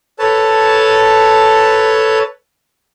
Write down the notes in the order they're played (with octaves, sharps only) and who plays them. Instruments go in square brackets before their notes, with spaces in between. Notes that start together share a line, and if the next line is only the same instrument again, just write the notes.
[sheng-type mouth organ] A4 B4 C#5 A5